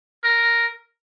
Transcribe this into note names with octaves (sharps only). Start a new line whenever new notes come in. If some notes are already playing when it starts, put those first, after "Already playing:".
A#4